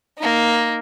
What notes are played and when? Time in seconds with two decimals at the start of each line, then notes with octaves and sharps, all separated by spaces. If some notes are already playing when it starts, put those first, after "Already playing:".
0.18 A#3 D#4